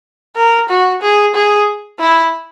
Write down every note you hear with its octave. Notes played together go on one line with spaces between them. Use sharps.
A#4
F#4
G#4
G#4
E4